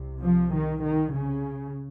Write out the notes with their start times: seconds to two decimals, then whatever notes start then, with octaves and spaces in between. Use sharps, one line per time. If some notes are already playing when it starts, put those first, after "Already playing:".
Already playing: C2 C3
0.22 F3
0.52 D#3
0.82 D#3
1.12 C#3